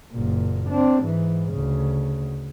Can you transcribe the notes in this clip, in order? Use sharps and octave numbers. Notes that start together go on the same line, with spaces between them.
F#1 A#2
C4 D4
G#2 E3
D2 C#3